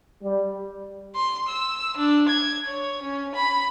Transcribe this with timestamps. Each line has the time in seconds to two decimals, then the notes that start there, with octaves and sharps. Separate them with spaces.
0.21 G3
1.15 C6
1.49 E6
1.97 D4
2.28 G#6
2.66 C#5
3.03 C#4
3.35 B5